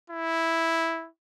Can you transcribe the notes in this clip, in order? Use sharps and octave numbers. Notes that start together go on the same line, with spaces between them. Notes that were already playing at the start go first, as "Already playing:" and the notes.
E4